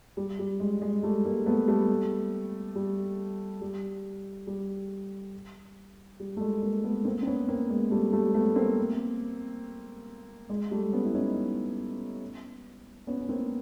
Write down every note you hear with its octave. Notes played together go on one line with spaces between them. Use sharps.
G3
G3
G#3
G#3
G3 A3
G#3 A#3
A3 B3
G3 A3
G3
G3
G3
G3
A3
G#3
G#3 A#3
A3 B3
A#3 C4
C4
B3 C#4
A#3 C4
G#3 A#3
G3 A3
G3 A3
A3 B3
A#3 C4
G#3
G3 A3
B3 C#4
E4
C#4 D#4
B3 C#4
C#4
A#3 C4